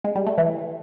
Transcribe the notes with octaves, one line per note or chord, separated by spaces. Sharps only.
G#3
G3
A3
E3